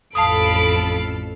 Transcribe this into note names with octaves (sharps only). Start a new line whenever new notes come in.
A1 F2 A4 F5 A5 B5 D#6 D7